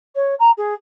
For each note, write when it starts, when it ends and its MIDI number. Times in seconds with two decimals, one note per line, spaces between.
0.15 0.34 73
0.39 0.50 82
0.57 0.73 68